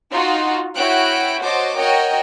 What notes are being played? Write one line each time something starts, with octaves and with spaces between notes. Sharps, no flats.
D#4 F4 F#4
E4 F#4 C#5 G5 F#6 D7
F#4 C5 C#5 D#5 A5 D6
F#4 A#4 C#5 D#5 G5